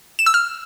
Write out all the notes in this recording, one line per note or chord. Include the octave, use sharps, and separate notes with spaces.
E7
E6
F6